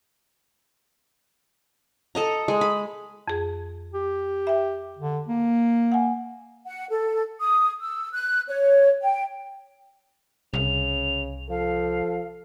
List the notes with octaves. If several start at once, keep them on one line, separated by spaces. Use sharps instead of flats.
A4 D#5 A#5
G#3
B5
F2 G#4
G4
E5 G5
D3
A#3
F#5 G#5
F#5
A4
D#6
E6
F#6
C#5
G5
C2 C#3 F7
F3 A4 F5